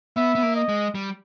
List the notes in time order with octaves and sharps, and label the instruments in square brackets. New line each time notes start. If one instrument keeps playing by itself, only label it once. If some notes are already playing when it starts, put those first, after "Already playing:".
[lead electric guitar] B3 [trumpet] E5
[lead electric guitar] B3
A#3
[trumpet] D#5
[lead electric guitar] G#3
G3